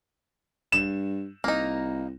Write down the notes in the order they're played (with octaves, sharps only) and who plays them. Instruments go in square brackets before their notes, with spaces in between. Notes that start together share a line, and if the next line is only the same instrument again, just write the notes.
[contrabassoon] G2 [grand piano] E7
[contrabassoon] C2 [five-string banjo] A#3 D#4